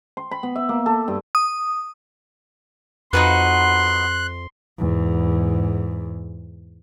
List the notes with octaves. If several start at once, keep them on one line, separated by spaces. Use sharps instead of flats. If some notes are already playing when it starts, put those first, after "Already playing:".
C6
B5
B3
E5
A#3
A4
G2
D#6
F2 D#4 F#4 B4 C6 F#6
E2 G#2